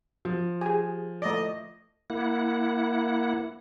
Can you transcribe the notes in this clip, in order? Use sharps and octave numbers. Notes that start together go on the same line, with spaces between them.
F3
G4 G#4 G#5
A3 D5 D#5
A#3 E4 F#5